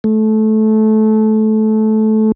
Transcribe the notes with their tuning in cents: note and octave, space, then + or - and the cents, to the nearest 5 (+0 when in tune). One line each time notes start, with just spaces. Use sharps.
A3 -20